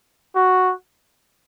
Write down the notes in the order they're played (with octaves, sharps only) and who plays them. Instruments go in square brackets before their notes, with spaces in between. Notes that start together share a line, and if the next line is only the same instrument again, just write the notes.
[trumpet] F#4